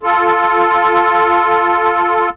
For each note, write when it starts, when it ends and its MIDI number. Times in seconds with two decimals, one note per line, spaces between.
0.03 2.30 65
0.03 2.30 69